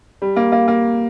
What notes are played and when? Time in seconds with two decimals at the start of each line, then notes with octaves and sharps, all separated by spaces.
0.22 G3
0.36 A#3
0.52 A#3
0.68 A#3